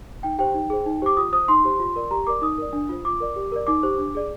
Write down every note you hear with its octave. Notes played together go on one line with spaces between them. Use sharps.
D#4 G5
G4 C5 G5
D#4
G#4 C5
D#4
G4 C5 D6
F4 D#6
C5 D#6
D#4 C6
G4 C5
F4
A#4 D5
G4 A#5
A#4 D5 D6
D#4 D#6
A#4 D5
D4
F4 C5
F4 D6
A#4 D5
G4
A#4 D5
D#4 D6
G4 C5
D4
G#4 D5